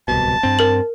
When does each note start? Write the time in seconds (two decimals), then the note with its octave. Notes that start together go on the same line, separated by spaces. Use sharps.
0.08 D1 C2 B2 A5
0.43 G2 C4
0.59 A#4 F#7